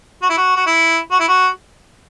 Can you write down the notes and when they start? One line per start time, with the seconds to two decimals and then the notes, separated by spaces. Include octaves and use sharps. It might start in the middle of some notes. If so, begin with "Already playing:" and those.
0.22 F#4
0.30 E4
0.38 F#4
0.56 F#4
0.67 E4
1.12 F#4
1.20 E4
1.28 F#4